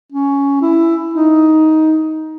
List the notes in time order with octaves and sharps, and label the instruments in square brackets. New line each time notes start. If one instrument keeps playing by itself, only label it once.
[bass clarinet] C#4
E4
D#4